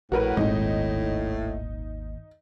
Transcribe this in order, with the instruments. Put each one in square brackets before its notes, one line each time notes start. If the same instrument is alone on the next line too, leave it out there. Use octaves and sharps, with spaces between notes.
[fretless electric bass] A#1 [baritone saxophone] A2 [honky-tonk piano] F#4 A#4 B4
[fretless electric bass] D#1 A#2 G#3 [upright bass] G#1 D#2 [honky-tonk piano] D#4